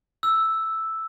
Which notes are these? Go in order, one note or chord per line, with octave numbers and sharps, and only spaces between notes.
E6